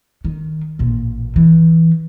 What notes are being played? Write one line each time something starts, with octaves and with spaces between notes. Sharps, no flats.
D#3
A1 A#2
E3